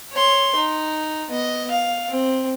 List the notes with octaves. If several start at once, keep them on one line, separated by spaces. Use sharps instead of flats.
C#5 C6
D#4
B3 D#5
F5
C4